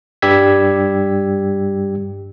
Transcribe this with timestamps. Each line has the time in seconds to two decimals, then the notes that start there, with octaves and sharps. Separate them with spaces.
0.22 G2 G3 G4 E6 G#6 B6